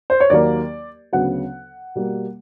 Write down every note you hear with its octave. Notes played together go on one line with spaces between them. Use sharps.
C5
C#5
D#2 D#3 F#3 A#3 D5
D2 C#3 F#3 B3 F#5
B2 G3 A#3